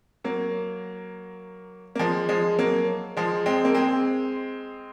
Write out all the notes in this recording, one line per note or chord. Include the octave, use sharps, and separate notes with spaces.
F#3 A#3
A#3
F3 G#3
F3 G#3
F#3 A#3
F3 G#3
G#3 C4
A#3
G#3 C4